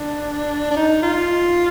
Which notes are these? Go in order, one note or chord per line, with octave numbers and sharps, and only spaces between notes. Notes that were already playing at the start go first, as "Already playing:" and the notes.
Already playing: D4
D4
D#4
F4